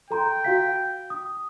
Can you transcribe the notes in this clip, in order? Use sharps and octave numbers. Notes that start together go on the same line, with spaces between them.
A4 G5 A#5 C6
F#4 F5 B6
D#6